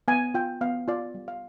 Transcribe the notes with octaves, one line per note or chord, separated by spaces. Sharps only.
B3 G#5
F4 G5
B3 F5
F4 D5
G3
F5